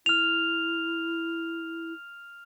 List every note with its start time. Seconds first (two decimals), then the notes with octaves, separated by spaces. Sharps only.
0.06 E4 F6 F7